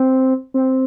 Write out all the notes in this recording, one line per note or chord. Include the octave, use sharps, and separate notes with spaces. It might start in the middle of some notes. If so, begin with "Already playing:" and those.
Already playing: C4
C4